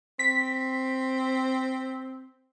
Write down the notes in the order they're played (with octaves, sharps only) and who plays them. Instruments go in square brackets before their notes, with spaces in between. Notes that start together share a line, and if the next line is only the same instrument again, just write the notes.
[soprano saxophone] C4 [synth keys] B6